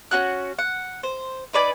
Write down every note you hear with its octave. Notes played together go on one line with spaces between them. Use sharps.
C#4 F#4 F#6
F#5
C5
D#4 B4 D5 G#5